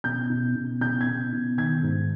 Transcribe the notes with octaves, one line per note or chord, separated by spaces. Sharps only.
B2 G6
B2
B2
B2 G6
G#6
B2
B2
D#3 G#6
G#2